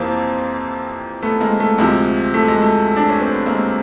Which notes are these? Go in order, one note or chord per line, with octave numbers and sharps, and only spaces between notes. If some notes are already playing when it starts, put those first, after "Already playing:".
Already playing: F2 C3 E3 A#3 C4
A3 B3
G#3 A#3
A3
D2 C3 F3 G#3
A3
G#3
A3
D4
C#4
C4
B3
G#3 A#3